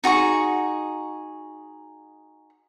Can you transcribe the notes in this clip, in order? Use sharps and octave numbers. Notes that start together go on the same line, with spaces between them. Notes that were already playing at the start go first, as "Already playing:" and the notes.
D#4 F#4 G#4 C#6